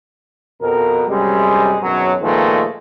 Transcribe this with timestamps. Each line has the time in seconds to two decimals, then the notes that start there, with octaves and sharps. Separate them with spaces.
0.62 F2 B2 A#4
1.08 F#2 C3 G3 G#3
1.82 G#1 F#2 B2 F#3
2.21 A#2 D#3 F3 G#3 A3 B3